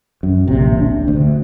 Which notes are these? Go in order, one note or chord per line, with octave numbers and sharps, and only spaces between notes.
F#2
D1 A#1 C3
D4
D2